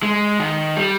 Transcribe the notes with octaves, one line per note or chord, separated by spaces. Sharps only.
G#3
D#3
G3